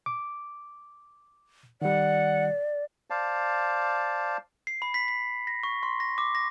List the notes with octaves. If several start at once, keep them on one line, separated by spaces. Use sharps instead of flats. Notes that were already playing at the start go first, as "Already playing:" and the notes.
D6
D#3 G3 D5 F#5
C5 D5 F5 A5
C7
B5
B6
B6
A#6
C#6
C6
A#6
D6
A#6